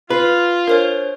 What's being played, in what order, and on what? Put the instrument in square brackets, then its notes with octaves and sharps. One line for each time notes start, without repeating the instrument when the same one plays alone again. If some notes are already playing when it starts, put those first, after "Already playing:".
[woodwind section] F4 [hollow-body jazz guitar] B4
[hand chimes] D4 C5 C#5 [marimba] A#4